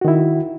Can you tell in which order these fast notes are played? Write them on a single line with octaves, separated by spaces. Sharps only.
F#4 D#3 E4